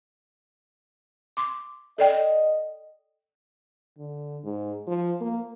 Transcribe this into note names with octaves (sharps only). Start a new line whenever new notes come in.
C6 D6
A4 D5 D#5 G5
D3
G#2
F3
A#3